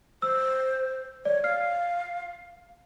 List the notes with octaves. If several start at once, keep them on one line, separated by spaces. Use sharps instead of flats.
C5 E6
C#5 D5
F5 F6 C7